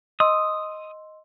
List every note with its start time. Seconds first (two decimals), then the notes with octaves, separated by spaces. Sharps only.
0.20 D#5 C6 D#6 E6